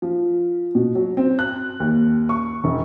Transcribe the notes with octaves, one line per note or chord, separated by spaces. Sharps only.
F3
B2
F#3
C4
F#6
D#2
C#6
E1